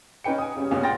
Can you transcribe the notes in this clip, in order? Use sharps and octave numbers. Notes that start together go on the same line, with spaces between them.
C#4 D#4 B4 G5 C#7
G#5 D#6
C#3 G3 C#4
C#2 A#2 B3 C#4
F#5 G5 C6 F6 A6 A#6